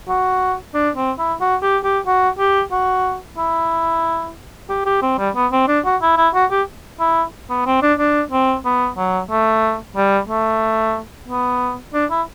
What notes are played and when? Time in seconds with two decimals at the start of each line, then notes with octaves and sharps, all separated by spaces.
0.09 F#4
0.74 D4
0.96 C4
1.19 E4
1.41 F#4
1.62 G4
1.84 G4
2.06 F#4
2.39 G4
2.71 F#4
3.38 E4
4.69 G4
4.86 G4
5.02 C4
5.18 G3
5.35 B3
5.52 C4
5.68 D4
5.85 F#4
6.02 E4
6.17 E4
6.34 F#4
6.51 G4
7.00 E4
7.50 B3
7.66 C4
7.82 D4
7.99 D4
8.32 C4
8.65 B3
8.97 F#3
9.30 A3
9.96 G3
10.29 A3
11.28 B3
11.94 D4
12.10 E4